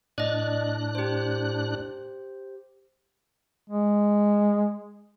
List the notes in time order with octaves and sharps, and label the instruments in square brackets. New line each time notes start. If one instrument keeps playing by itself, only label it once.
[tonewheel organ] A2 D4 F#6 [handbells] D5 D#5
[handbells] G4 C5
[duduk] G#3